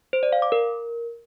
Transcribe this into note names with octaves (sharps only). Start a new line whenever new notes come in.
C5
D5
F5
D6
A#4